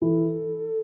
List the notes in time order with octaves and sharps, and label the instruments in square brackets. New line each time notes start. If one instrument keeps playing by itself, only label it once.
[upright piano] E3 E4 [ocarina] A4